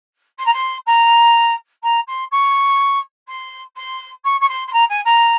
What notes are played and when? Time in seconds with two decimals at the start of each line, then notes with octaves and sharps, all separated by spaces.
0.38 C6
0.46 A#5
0.53 C6
0.86 A#5
1.83 A#5
2.07 C6
2.31 C#6
3.28 C6
3.76 C6
4.24 C#6
4.40 C#6
4.49 C6
4.67 C6
4.73 A#5
4.89 G#5
5.05 A#5